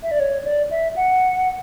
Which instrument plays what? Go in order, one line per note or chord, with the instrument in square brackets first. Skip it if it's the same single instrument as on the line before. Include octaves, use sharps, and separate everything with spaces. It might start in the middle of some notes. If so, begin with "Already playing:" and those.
[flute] E5
D5
C#5
D5
E5
F#5